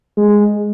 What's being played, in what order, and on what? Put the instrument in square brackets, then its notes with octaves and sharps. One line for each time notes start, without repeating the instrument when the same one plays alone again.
[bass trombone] G#3